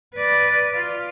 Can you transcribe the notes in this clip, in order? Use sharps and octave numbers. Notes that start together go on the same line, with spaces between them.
B4 D5
F4